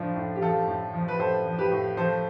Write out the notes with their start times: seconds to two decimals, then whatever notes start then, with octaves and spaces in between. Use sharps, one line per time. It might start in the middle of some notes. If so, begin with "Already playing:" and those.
Already playing: A2 F3 D4
0.16 A2
0.35 G4
0.41 F3 F4 A4
0.67 A2
0.93 F3
1.08 B4
1.19 A2 A4 C5
1.45 F3
1.59 G4 B4
1.71 A2
1.97 F3 A4 C5